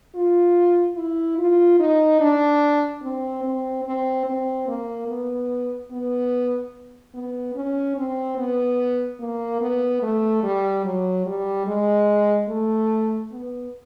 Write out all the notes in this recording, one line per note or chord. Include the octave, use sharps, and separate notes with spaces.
F4
E4
F4
D#4
D4
C4
C4
C4
C4
A#3
B3
B3
B3
C#4
C4
B3
A#3
B3
A3
G3
F#3
G3
G#3
A3
B3